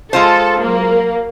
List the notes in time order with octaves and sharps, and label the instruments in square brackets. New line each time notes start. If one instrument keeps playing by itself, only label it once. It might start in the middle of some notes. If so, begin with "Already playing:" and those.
[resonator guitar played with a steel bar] G#3 F4 C5 [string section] A4
[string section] F#3 A#3